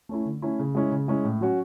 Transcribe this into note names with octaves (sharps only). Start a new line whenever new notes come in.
A3 C#4 E4
D3
A3 C#4 E4
C#3
G#3 C#4 E4
C#3
G#3 C#4 E4
A2
F#3 C#4 F#4